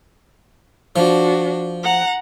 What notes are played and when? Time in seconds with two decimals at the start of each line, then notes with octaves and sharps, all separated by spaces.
0.96 F3 D4 F#4
1.83 F#5 A#5